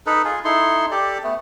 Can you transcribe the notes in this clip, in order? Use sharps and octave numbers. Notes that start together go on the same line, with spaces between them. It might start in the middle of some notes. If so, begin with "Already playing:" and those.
D#4 A4 B4
F4 G#4
D#4 E4 A4 C6
G4 A4 D5
A3 B3